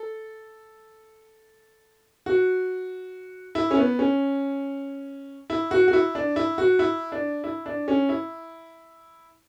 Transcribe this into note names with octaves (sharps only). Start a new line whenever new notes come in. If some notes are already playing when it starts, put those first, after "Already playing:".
Already playing: A4
F#4
E4
C#4
B3
C#4
E4
F#4
F#4
E4
D4
E4
F#4
E4
D4
E4
D4
C#4
E4